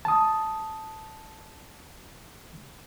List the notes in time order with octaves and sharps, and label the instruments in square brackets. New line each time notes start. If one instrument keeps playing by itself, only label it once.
[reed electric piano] A5 D#6